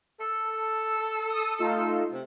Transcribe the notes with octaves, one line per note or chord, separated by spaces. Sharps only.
A4
D#6
A3 D#4 F4
C3